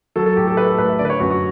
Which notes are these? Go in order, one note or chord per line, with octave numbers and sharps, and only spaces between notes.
F#3 A4
A4
A2 G4
A4
A3 B4
A4
A2 B4
E5
D3 D5
B4
C#5
F#2 F#4
F#4